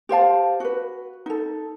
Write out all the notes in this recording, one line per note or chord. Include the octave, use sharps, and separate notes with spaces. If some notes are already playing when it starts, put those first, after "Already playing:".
G4 C5 F5 A5
F#4 B4
D#4 A4